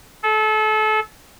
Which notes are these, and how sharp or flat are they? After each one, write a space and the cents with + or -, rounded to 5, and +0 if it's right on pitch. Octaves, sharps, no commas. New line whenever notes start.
A4 -30